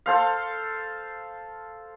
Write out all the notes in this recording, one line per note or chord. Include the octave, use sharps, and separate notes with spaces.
A4 C5 F5